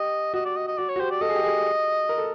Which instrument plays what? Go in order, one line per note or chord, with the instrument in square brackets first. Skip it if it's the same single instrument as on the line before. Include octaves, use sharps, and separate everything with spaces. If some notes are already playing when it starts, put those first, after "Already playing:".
Already playing: [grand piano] G4 [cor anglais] D#5
[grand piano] F#4 [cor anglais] D#5
[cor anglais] D5
D#5
D#5
[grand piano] F#4 [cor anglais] D5
[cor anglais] C#5
[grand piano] F#4
[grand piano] G4 [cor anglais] C5
[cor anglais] D5
[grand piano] A4 [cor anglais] D#5
[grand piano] G#4
G4
G#4
A#4
A4